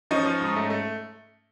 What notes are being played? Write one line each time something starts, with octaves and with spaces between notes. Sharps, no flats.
F3 C#4 D#4
F3
G#2
A3
A3